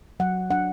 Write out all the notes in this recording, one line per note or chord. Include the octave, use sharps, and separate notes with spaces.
F#3 F#5
D4 F#5